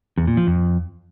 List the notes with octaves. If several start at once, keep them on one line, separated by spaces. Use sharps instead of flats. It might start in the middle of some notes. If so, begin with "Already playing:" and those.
E2
A#2
F3
F2